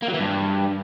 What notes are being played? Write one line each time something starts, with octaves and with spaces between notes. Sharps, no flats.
A#3
F#3
E3
G2